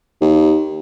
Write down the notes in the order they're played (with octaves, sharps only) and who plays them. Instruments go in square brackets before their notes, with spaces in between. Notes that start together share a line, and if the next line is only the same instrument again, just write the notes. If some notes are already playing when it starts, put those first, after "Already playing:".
[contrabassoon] D#2